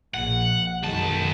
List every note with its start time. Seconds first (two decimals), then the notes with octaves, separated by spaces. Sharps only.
0.14 A#1 F#5
0.83 B1 F#2 D#3 G#3 A5